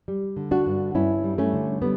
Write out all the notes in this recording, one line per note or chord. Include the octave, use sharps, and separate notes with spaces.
G3
D3
D4 F#4
G2
G2 C#4 E4
G3
A3 C#4
D3
G3 B3